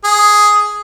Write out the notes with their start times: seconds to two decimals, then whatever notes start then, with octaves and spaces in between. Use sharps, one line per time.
0.04 G#4